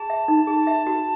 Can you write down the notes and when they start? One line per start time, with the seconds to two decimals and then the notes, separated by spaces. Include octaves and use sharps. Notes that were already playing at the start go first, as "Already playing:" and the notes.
Already playing: G#4 A5
0.10 E5
0.28 D#4
0.47 G#4
0.67 E5
0.87 F#4